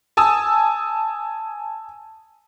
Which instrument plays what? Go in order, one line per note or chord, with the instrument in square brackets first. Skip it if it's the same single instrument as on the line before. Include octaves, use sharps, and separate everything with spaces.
[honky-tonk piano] G#5 A5 D#6 E6